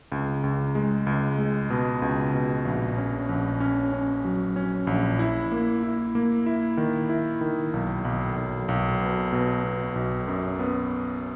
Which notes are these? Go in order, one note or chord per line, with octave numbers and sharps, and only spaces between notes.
C#2
C#2
G#3
C#2
G#3
B2
C#2
B2
A#1
C#4
A#1
C#4
C#4
F#3
C#4
A#1
E4
A#3
E4
A#3
E4
D#3
E4
D#3
B1
B1
B1
B1
B2
B2
B2
B1
F#2
B3